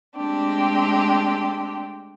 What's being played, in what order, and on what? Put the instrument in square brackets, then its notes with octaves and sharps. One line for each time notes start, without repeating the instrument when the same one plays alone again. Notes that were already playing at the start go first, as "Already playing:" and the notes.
[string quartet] G#3 A3 C4 D4 G4